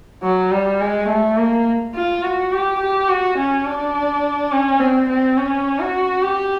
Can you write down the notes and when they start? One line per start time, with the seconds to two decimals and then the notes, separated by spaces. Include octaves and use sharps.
0.23 F#3
0.52 G3
0.81 G#3
1.09 A3
1.37 A#3
1.94 F4
2.23 F#4
2.52 G4
2.80 G4
3.09 F#4
3.38 C#4
3.66 D4
4.52 C#4
4.80 C4
5.09 C4
5.37 C#4
5.80 F#4
6.23 G4